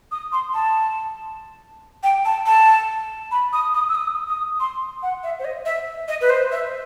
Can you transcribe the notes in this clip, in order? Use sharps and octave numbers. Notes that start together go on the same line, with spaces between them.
D#6
C6
A5
G5
A5
A5
B5
D#6
D#6
E6
D#6
D#6
C6
F#5
E5
C5
D#5
E5
D#5
B4
C5
E5